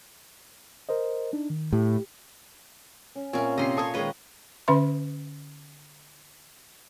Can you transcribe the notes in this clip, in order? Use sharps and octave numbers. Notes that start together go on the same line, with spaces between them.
A#4 C5 D#5
D4 D#4
D#3
A2 G4
C#4
A#2 C4 C#4 A#4 C#5 E5
C3 C#4 D#5 C6 C7
A4 C#5 C#6 D#6
D#3 G#3 B4 C#5 D#5
D3 C#4 B4 E5 C6